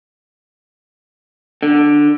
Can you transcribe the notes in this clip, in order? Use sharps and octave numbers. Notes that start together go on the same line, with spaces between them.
D3